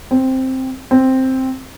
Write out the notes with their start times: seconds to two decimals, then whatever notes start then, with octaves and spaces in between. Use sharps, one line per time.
0.11 C4
0.91 C4